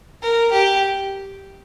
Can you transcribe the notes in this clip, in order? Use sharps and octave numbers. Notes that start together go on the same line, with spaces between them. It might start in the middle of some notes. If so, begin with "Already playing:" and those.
A#4
G4